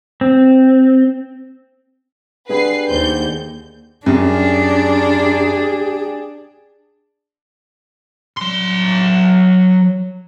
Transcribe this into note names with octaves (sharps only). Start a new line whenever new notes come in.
C4
D3 G4 G#4 B4 C7
D#2 C5 G6
F#2 D4 G4 G#4
F#3 C6